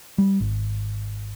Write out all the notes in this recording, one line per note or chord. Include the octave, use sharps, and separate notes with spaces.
G3
G#1